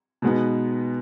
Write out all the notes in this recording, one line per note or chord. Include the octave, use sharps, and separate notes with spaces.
B2 G#3 B3 D#4